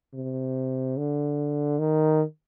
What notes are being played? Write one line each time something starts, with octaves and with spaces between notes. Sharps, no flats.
C3
D3
D#3